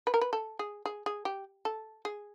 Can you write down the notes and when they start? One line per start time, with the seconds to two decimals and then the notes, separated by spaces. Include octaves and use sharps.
0.07 B4
0.14 A#4
0.21 B4
0.33 A4
0.59 G#4
0.86 G#4
1.06 G#4
1.25 G4
1.65 A4
2.05 G#4